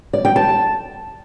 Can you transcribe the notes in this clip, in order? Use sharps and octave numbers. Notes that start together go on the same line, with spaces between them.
D5
G5
A5